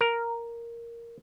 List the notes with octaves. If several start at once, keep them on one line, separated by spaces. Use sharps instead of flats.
A#4